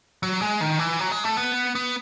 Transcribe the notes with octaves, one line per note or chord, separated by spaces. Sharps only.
F#3
G#3
D#3
E3
F#3
G#3
A3
B3
B3